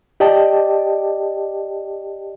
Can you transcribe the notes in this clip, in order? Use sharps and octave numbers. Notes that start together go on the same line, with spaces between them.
G4 D5 D#5 G5 A5